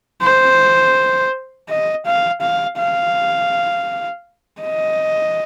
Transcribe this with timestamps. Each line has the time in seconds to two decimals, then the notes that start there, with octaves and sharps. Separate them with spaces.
0.22 C5
1.69 D#5
2.06 F5
2.42 F5
2.78 F5
4.61 D#5